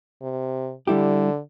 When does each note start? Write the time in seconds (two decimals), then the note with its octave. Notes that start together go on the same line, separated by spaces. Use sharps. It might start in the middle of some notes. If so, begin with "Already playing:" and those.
0.22 C3
0.87 D3 G3 E4 G4